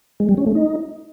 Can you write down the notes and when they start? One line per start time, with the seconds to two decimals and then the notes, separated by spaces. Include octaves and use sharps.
0.20 G#3
0.29 G3
0.38 C#4
0.46 A3
0.55 D#4